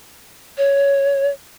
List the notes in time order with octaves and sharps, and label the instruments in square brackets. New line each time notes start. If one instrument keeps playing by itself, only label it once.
[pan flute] C#5